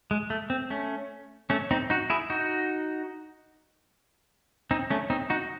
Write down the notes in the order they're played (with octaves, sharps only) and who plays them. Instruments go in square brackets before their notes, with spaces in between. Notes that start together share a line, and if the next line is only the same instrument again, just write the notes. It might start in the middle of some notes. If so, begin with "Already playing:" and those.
[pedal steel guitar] G#3
A3
C4
A3 C#4
A3 C#4
C4 D#4
D#4 F#4
E4 G#4
D#4 F#4
C4 D#4
A3 C#4
C4 D#4
D#4 F#4